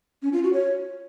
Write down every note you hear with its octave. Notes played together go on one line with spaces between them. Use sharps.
C#4
F4
F#4
C#5